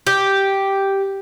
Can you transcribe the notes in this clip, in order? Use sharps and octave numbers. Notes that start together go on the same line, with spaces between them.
G4